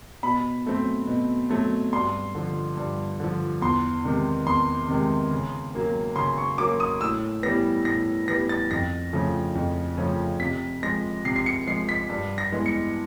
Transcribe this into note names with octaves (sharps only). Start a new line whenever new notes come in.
B2 B5
F#3 A3 C4
B2
F#3 A3 C4
G2 C6
D3 F3
G2
D3 F3
E2 C6
C3 D#3 G#3
E2 C6
C3 D#3 G#3
C#3
F#3 A#3 C#4
C#3 C6
C#6
F#3 A#3 C#4 D6
D#6
A2 E6
E3 G3 B3 A#6
A2 A#6
E3 G3 B3 A#6
A6
F2 A#6
C#3 F3 A3 C#4
F2
C#3 F3 A3 C#4
C3 B6
F3 G#3 A#6
C3 C7
C7
C#7
F3 G#3 C7
B6
G2
A#6
E3 G#3 B3
C#7